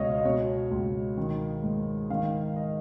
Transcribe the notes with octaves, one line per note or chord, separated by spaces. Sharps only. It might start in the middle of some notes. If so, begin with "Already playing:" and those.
Already playing: C#2 B2 C#5 D#5 F5
D#5
B2 C#5
C#2
D#3
G#2
D#3 F5
D#5